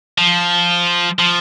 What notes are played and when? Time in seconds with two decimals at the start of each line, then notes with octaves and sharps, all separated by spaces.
0.18 F3
1.19 F3